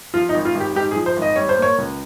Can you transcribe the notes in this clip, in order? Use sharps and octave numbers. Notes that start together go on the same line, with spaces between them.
F3 F4
D#4
G#1
F4
G#1
G4
G#2 G4
G#4
F3
C5
G#1
D#5
G3 C#5
C5
A#3 C#5
C#2